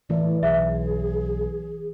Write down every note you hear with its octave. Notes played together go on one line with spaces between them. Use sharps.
A2 E3 D5
B1 G#4 E5